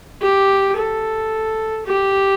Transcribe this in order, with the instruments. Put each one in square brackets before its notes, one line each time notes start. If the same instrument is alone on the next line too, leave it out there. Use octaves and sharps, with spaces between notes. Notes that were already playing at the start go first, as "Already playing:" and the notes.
[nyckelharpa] G4
A4
G4